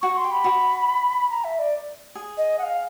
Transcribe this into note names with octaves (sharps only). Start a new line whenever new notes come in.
F#4 C#6
C6
G4
B5
F#4
A#5
E5
D5
G#4
D#5
F#5
F5